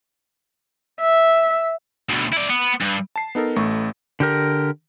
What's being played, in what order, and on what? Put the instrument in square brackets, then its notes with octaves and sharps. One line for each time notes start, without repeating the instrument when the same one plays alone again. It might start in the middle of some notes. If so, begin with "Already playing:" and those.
[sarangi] E5
[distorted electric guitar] D2 B2
E4 D5
B3
G2
[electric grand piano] A5 C7
B3 D#4 A4 A#4
A1 A3 C#6
[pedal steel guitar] D3 G4 A#4